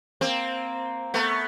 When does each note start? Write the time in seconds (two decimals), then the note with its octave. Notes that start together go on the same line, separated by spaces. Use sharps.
0.21 A#3 C4
1.14 A3 B3